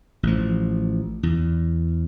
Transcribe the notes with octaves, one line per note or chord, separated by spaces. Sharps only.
A1 F3
E2